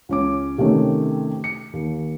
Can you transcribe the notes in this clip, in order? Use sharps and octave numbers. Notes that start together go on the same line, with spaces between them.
C#2 C#4 D6
C3 D#3 A3 C#4 G4
C#7
D#2